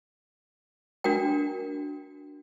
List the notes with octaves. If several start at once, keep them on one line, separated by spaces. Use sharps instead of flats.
D4 F#4 A#4 G5